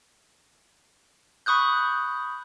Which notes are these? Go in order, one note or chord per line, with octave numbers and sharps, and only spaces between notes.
B5 C#6 D#6 F#6 G6